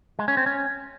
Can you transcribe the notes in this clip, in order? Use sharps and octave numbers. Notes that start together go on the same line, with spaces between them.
G#3
C#4
C4
C#4